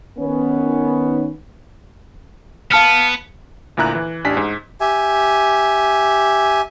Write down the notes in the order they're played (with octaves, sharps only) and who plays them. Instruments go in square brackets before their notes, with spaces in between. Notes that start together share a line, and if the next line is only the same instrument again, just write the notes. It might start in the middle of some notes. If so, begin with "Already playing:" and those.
[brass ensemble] D#3 B3 C#4
[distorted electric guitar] B3 [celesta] F5 A5 F6
[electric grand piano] D2 A#2 E4 A#5 F#6
E3
A1 D4 G4 G#5 B6
G#2
[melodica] G4 E5 G#5